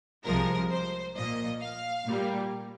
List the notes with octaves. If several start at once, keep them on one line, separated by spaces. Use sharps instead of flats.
C2 C3 F3 G#3 A#4
C5
A#2 F3 A#3 D#5
F5
A#2 G3 A#3